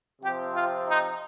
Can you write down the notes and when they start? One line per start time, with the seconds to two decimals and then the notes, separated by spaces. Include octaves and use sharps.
0.22 C3 F3 C4 G4
0.54 F4
0.87 D#4